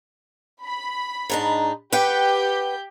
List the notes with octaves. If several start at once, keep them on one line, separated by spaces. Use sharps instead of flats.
B5
G#2 D4 D#4
G4 B4 F#5 G5 G6